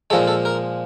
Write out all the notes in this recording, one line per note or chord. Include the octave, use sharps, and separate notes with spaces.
A#2 F3 G#3 A4
A4
A#4